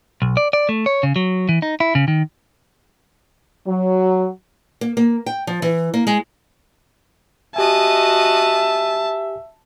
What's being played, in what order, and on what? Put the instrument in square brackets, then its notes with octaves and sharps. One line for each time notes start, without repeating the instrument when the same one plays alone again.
[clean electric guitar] B1
D5
D5
A3
C#5
C#3
F#3
E3
D#4
E4
C#3
D#3
[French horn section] F#3
[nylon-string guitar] A#3
A#3
G5
F3
E3
A#3
G#3
[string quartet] F#4 D#5 D#6 [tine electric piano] G4 G#5 [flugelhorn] E5 [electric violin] A5